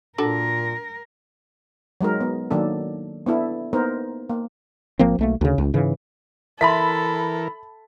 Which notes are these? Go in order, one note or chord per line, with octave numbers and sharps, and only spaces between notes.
A#2 D4 F#4 A4 A#4
F#3 G#3 D#4 A#4
B3
D#3 F#3 A#3 D4 A4
B3 D4 E4 A4
A#3 B3 D#4 A#4 C5
A#3
G#1 F3 A#3 C4
B1 A3 A#3
D2 C#3
C#2
G#2 C#3 E3
E3 A4 A#4 E5 A5 B5 C6 B6